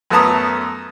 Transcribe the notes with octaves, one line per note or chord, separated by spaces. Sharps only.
F#2 A3 B3 A5 A#5 D#6